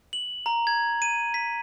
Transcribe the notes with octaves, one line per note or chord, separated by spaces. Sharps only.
F#7
A#5
G#6
D#7
B6